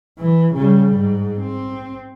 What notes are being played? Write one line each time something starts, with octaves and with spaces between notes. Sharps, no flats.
E3
C#3 G3
G#2
C4